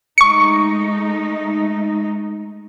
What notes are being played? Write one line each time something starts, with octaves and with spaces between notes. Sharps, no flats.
G#3 A3 D#4 C#6 C#7